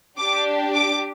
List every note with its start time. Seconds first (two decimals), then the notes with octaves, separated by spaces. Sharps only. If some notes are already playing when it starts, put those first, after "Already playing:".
0.19 D4 G4 D6
0.75 D6